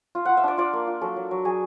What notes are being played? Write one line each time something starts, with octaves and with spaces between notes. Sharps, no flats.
F4
F4 F#5
E5
D4 D5
F4 D5
A#3
F4
F#3 A4
F#3
F#3
F#3 G#4